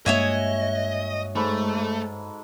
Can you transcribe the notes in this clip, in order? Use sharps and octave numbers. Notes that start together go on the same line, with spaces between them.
G2 G#3 A#3 F#4 C#5 D#5 E5 G#5
G#2 A3 A4 B5